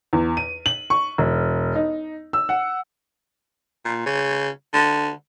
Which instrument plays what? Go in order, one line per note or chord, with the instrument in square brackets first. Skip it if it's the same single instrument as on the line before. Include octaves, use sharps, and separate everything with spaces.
[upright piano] E2
D#7
F#7
C#6
E1
D#4
E6
F#5
[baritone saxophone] A#2
C#3
D3